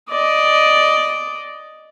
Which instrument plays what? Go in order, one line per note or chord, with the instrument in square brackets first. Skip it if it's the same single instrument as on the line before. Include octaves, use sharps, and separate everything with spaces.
[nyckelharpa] D5 D#5